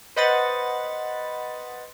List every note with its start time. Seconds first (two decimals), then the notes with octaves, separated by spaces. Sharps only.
0.16 B4 C5 D#5 F#5 B5 A6